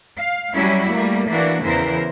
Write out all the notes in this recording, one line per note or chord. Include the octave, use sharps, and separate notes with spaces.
F5
F#3 G3 C#4 E4 F#4 G4
G3 A3 A#3
E3 A#3 D4 F#4
E2 C#3 E3 A#4 C5